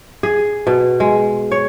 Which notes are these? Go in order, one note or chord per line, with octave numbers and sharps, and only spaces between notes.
G#4
B2
G#3
C#5